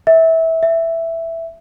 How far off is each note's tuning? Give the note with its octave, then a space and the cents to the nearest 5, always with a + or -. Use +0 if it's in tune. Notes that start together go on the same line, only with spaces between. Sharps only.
E5 -20
E5 +5